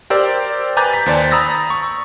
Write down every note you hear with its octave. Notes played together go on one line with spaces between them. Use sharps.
G4 A#4 C5 D5 E6
B4 G#5 A#5 D6 G6 A6
A6 B6
D#2 C5 D5 A5
A#5 B5 D#6 E6 A6 A#6
C#6